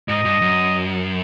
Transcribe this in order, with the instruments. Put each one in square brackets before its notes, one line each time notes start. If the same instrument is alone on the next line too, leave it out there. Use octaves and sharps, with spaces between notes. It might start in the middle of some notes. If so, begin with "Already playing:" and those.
[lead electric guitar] G#2 [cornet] D#5
[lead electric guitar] G2
F#2